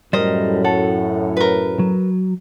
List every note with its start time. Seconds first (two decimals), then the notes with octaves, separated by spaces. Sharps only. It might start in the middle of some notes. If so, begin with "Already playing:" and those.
0.13 F#2 A2 G3 A#4 C5 D#5
0.64 A4 C#5 F#5
1.37 A#4 B4
1.79 F#3